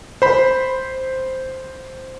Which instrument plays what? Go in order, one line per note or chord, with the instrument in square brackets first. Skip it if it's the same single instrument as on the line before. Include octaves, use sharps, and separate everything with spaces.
[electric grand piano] C5 B5